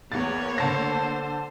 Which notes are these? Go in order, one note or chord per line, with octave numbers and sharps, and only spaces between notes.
E2 A#3 B3 C#5 A6
D3 C5 A5 A#6